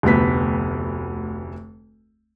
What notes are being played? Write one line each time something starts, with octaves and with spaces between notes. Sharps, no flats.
F1 D2 B3 B6